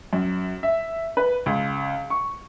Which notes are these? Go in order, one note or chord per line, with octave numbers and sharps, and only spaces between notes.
F#2
E5
B4
C#2
C#6